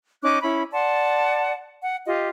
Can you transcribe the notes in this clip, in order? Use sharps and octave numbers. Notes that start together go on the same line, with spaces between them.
C#4 D#4 D6 F#6
C#4 E4 B5
D5 F#5 A5 C6
F#5
F4 G4 D#5